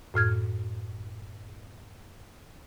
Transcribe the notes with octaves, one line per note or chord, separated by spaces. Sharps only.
F#2 A2 F6 G#6